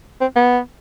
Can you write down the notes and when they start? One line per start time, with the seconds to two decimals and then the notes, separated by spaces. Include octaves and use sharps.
0.21 C4
0.36 B3